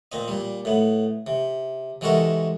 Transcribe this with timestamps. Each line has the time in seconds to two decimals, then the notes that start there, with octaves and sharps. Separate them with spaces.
0.12 A#2 C4 D#5
0.28 A#2 G3
0.65 A2 B3
1.27 C3
2.01 C3 E3 G#3 F#4 A4 A#4